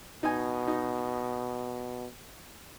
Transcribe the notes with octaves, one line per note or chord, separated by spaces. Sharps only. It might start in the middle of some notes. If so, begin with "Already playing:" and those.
B2 D#4 G#5
D#4